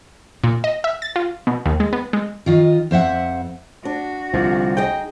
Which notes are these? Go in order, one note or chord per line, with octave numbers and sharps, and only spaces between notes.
A#2
D#5
E5
A6
F4
B2
D#2
G#3
B3
G#3
D#3 F4 D#5
F2 C5 E5 F#5
D4 F#4
C2 D3 F3
D#4 G#4 D#5 G5